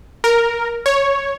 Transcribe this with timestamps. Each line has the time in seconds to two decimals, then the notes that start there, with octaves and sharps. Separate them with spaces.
0.24 A#4
0.86 C#5